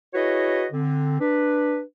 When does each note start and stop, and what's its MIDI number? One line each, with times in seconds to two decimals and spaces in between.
0.14 0.66 64
0.14 0.66 66
0.14 0.66 68
0.14 0.66 71
0.14 0.66 73
0.14 0.66 75
0.72 1.17 50
0.72 1.17 60
1.20 1.81 62
1.20 1.81 71